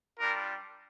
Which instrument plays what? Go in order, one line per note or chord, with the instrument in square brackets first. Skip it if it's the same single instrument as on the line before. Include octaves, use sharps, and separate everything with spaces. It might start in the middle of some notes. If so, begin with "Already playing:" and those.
[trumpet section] G3 D4 F4 A#4